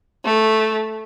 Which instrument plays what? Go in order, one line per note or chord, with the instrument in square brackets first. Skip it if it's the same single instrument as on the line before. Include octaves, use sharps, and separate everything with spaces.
[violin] A3